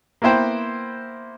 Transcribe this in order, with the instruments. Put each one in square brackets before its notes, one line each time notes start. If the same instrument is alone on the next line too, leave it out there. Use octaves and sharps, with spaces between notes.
[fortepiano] A#3 B3 E4 C5 G5